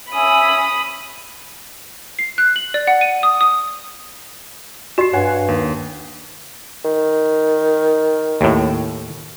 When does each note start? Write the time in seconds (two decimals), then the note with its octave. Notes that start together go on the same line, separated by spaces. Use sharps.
0.12 C#4 E5 G#5 B5 D#6
2.19 C7
2.38 F#6
2.56 F#7
2.74 D5
2.87 F#5
3.01 D#7
3.23 D#6
3.41 D#6
4.98 F#4 G4 D#5 C7 E7
5.13 G2 C#5 F#5 G#5
5.48 D#2
6.85 D#3
8.41 D#2 A2